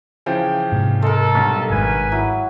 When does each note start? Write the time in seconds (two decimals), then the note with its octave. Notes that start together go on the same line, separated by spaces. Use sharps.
0.26 C#3 E3 F3 G5
0.72 G#2 C3
1.02 G#3 A4 A#4
1.35 B1 G2
1.70 G#1 G#2 B4 G#5
2.12 F#3 E4